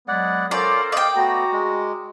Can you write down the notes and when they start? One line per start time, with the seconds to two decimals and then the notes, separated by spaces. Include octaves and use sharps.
0.08 F#3 G#3 B3 D5 F#5
0.51 C#4 F4 A4 A#4 C5 D5 A#5
0.92 D5 D#5 F5 G5
1.16 A3 B3 F#4 A#5
1.52 G#3